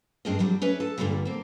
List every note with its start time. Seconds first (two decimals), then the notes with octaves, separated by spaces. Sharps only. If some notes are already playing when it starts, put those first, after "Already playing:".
0.25 G2 C4 D4 G#4 A#4 D#5
0.39 F2 F#3 G3 C4
0.62 C#4 B4 E5
0.80 A4
0.98 G2 A#2 D3 D#3 F3 G3
1.25 A#3 C4